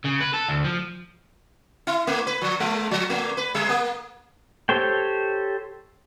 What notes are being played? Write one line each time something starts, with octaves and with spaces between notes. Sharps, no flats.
C#3
B4
A4
D2
F3
E4
A3
B4
F3
G#3
F3
A3
B4
G3
A#3
G4 A4 C5 C#5 G5